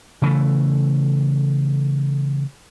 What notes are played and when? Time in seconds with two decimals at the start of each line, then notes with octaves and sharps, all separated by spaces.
0.22 C#3 E3 A3